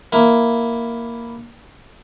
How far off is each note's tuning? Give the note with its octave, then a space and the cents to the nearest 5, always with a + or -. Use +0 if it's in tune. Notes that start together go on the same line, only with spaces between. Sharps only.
A#3 +0 E4 +0